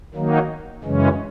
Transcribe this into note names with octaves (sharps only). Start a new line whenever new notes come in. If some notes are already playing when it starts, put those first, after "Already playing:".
D#3 F#3 A#3 D#4
F#2 C#3 E3 G#3 C#4